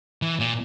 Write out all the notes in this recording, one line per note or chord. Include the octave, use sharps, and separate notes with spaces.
E3
A#2